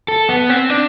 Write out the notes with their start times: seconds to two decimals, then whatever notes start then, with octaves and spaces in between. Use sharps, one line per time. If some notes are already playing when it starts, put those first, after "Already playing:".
0.08 A4
0.29 B3
0.49 C4
0.70 D4